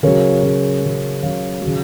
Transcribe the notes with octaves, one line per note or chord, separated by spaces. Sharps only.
C#3 F#3 A#4 C#5
C#3 F#3
C#3 F#3
C#3 F#3 C#5 F5
F#3
C#3